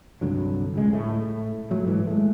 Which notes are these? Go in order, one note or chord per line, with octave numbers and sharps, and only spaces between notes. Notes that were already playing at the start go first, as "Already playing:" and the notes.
C2 G2 D3 F#3
D1 C#2 G#3
A2 A3
A#2 F#3 A3
G#2 E3
G#3 A3